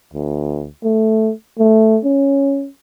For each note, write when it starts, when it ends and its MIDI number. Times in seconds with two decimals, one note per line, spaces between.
0.14 0.67 38
0.84 1.32 57
1.59 1.99 57
2.05 2.68 61